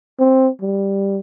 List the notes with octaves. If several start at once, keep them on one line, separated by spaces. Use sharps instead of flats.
C4
G3